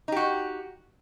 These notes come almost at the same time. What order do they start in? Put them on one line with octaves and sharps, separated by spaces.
D#4 G4 F#4